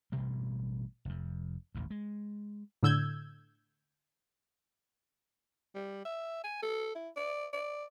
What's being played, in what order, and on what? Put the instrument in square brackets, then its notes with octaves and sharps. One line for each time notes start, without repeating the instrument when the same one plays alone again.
[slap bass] A1 G2 B2 G3
F1 F2
D#1 A1 E2
G#3
[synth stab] A2 D3 E6 G6 G#6
[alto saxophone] G3
E5
G#5
A4
E4
D5
D5